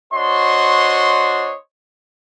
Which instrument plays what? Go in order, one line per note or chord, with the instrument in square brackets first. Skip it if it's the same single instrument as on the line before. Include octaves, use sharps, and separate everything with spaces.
[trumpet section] D4 F#4 C5 C#5 D#5 C6